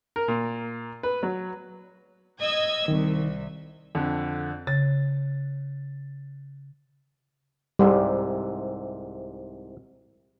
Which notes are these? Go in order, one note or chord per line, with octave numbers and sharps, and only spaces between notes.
A#4
A#2
B4
F#3
D#5 E6 G#6
C2 D#3
F2 D3
C#3 A6
C2 G#2 C3 G3